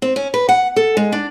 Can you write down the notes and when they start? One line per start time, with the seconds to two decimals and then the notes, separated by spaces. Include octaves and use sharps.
0.02 C4
0.16 C#4
0.34 B4
0.49 F#5
0.76 A4
0.97 G#3
1.12 D4